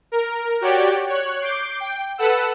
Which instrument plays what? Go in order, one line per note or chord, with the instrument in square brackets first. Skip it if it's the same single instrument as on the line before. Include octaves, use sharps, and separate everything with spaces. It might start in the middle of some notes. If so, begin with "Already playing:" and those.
[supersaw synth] A#4
F#4 G4 C#5 D5 G5
C#5 F#6
D6 G6 C7 D7
G5
A4 B4 F#5 E6